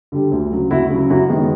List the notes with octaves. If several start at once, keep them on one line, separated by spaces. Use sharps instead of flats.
D3 G3
D2
C#3 F#3
D2 E4 F#4
C#3 F#3
F#2 E4 F#4
D#3 G#3 B3